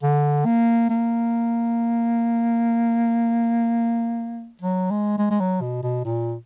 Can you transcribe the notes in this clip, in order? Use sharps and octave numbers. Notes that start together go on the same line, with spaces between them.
D3
A#3
A#3
F#3
G#3
G#3
G#3
F#3
B2
B2
A#2